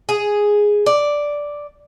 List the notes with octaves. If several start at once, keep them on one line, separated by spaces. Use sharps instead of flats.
G#4
D5